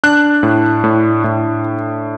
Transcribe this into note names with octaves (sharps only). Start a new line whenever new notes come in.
D4 F#6
A2
A2
A2